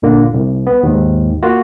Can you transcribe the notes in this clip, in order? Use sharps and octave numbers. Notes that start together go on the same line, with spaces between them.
G1 A#2 D3 A#3
C2
B3
D#2 G#2
A#3 F4 F#4